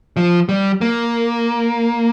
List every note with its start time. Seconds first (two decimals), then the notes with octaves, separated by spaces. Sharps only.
0.17 F3
0.49 G3
0.81 A#3